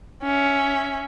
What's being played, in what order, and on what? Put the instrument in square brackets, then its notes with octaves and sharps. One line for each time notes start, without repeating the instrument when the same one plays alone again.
[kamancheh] C#4 E5